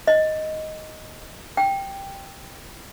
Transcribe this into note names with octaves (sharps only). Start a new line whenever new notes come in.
D#5
G5